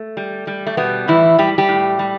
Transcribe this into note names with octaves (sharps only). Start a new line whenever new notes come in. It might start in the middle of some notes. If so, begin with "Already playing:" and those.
Already playing: A3
G3
G3
A3
B2 G3 B3
A2 E3 E4
G3 G4
G3 G4
A2
G3